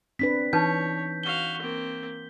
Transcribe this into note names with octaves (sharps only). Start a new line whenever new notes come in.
C4 D4 B4 B6
E3 D#4 B4 C#5 A5 G6
F#4 F5 G7
A#3 C4